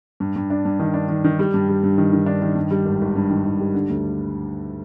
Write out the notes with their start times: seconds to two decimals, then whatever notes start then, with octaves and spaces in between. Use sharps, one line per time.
0.20 G2
0.36 G2
0.50 D4
0.65 G2
0.79 D#3
0.94 D4
1.08 D#3
1.24 D#3
1.39 G3
1.54 G2
1.69 G3
1.83 G2
1.98 D#3
2.13 D#3
2.26 D4
2.42 D#3
2.56 G2
2.71 G3
2.85 G#1
3.01 G#1
3.16 G2
3.30 D#3
3.44 G#1
3.59 G3
3.74 D3
3.90 D2